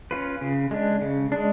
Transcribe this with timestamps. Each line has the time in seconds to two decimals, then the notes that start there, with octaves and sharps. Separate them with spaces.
0.11 C#4 F4 B4
0.41 C#3
0.71 G#3 D4
1.02 C#3
1.32 G#3 D4